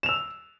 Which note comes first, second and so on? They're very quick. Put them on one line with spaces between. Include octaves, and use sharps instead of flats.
E7 F7 E6